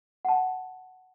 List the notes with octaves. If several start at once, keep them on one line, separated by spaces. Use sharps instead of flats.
F#5 A5